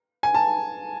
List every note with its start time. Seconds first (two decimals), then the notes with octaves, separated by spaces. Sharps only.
0.23 G#5
0.34 A5